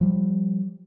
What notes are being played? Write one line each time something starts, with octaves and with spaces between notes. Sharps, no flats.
F3 G3